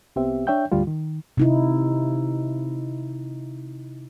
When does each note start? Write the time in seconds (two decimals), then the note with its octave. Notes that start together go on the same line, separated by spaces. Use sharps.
0.16 C2 B3 C4 G4 E5
0.47 D4 C#5 E5 G5 G6
0.72 D2 G#2 G3 F4
0.87 D#3
1.37 C3 D#4 E4